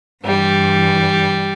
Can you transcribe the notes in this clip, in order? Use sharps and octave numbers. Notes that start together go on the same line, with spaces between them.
G2 E3 G3